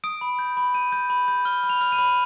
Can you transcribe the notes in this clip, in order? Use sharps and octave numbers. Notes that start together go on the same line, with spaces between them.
D#6 D7
B5
G6
B5
G6 D#7
G6
B5
G6
F6 G7
B5
F7
F6
D#7
B5